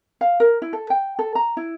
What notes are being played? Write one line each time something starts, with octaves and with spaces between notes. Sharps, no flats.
F5
A#4
E4
A4
G5
A4
A#5
E4